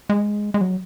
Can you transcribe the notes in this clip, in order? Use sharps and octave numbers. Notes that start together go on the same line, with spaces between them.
G#3
G#3
F#3